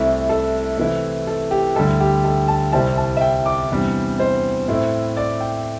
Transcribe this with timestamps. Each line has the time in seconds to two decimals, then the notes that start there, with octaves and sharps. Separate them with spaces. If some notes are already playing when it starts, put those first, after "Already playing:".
Already playing: C2 C3 A3 E4 E5
0.29 A4
0.77 C3 E3 A3 E4
1.27 A4
1.51 G4
1.76 D2 D3 G3 E4 A4
2.00 G4
2.24 A4
2.48 A5
2.72 C2 C3 G3 C4 E4 A5
2.97 A5
3.17 E5
3.21 G5
3.46 D6
3.71 E2 C3 G3 D4
4.19 C5
4.68 A2 A3 C4 E4
5.17 D5
5.40 G5